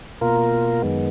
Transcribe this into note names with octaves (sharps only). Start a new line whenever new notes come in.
B2 A#3 F4 A#4
F#2 D#3 G#3 B3